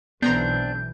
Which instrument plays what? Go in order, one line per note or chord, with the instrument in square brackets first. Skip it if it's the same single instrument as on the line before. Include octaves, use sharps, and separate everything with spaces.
[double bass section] B1 E3 [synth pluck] B3 A#5 C6 [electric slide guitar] C4 D4 [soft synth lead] G6